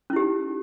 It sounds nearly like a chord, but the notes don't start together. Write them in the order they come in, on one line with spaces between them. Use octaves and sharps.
C#4 E4 G4 D#4